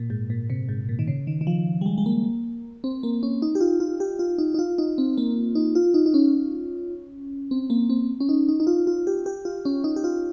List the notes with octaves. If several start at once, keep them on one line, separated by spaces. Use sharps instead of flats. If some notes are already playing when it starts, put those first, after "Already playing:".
Already playing: A#2
G#2
A#2
C3
G#2
A#2
D#3
C#3
D#3
D#3
F3
G3
G#3
G#3
A#3
C4
A#3
C#4
D#4
G4
F4
F4
G4
F4
D#4
D#4
F4
D#4
C4
A#3
D#4
F4
D#4
D#4
C#4
C4
A#3
C4
C#4
D#4
D#4
D#4
F4
F4
G4
G4
F4
C#4
D#4
G4
F4